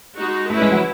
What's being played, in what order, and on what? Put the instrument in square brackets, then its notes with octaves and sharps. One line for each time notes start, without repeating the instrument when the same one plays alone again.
[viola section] G#3 D#4 F#4
[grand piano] A3 [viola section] C#4 E4 B4
[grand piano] G#3
F#3